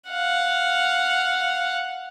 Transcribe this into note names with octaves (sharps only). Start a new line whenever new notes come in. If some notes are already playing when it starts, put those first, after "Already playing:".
F5 F#5